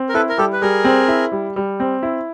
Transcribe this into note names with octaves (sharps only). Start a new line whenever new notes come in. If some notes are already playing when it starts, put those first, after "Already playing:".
Already playing: C4
A#4
E4 A4 B4
A#4
G3 G4 A4
B4
G3 G#4 A#4
C4
E4
G3
G3
C4
E4